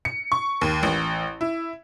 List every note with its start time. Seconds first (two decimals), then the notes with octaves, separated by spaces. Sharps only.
0.05 C#7
0.32 C#6
0.61 D#2
0.83 A1
1.41 E4